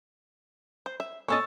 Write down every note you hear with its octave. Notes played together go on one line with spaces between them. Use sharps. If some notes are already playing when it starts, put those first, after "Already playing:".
C5
E5
A3 C#4 D#5 C#6 E6 A6